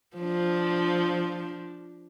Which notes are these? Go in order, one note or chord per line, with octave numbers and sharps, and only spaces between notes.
F3 D4